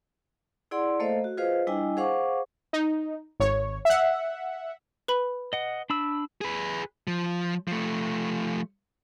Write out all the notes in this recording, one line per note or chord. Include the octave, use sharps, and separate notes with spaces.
E4 G#4 D5 F#5 C6
A3 A#3 A4 C5 D#5 F5
F#4
F4 G#4 B4 C5 D#5 F5
G3 D4 E4 D#5 G5 G#5
G#4 C5 F5 F#5 C#6 D6
D#4
G#1 C#5
E5 F#5
B4 B5
D#5 F#5
D4 B5 E6
G#4 B4
F3
F3 A3